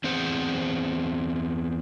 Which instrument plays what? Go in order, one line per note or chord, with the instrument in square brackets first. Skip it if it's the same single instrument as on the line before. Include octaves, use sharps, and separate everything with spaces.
[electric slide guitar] E2 C4 G#4 C5 F#5